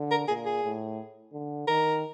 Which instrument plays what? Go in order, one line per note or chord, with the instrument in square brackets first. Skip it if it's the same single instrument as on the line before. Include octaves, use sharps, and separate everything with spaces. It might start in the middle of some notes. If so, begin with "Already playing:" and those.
Already playing: [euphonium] D3
[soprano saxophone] A#4
[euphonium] A#2 [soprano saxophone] G#4
[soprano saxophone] G#4
[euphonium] A2
D3
[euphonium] D#3 [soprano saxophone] A#4